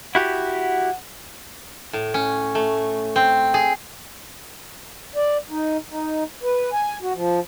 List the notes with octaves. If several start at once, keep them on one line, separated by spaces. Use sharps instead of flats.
E4 F#4 G4 F#5
A2
C#4
A3
C4
G#4
D5
D#4
D#4
B4
G#5
F#4
F3